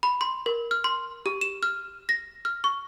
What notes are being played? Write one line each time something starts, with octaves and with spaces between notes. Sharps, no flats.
B5
C6
A#4
F6
C6
G4
E7
F6
A#6
F6
C#6